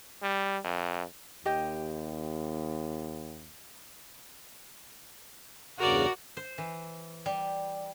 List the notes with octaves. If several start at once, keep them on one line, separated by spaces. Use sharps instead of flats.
G3
F2
D#2 G4 D#5 G5
E2 G2 C#3 F#4 A#4 D5
C5
E3
G3